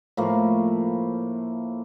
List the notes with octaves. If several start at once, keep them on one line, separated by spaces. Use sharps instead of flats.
A2 F3 A#3